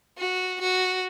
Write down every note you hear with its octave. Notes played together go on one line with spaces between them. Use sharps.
F#4
F#4